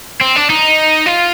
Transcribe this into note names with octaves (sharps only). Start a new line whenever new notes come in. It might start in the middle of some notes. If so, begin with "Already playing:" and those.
C4
D4
D#4
F4